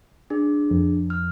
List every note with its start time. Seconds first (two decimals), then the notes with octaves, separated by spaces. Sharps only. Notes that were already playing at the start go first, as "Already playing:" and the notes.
0.30 D4 G#4
0.70 F2
1.10 F6